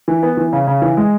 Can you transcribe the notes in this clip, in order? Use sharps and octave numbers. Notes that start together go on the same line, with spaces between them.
E3
B3
E3
C#3
C#3
E3
G#3